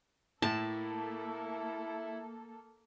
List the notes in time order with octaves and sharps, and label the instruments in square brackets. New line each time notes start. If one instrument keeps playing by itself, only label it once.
[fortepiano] A2 [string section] A#3 A4 [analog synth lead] E4 [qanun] A5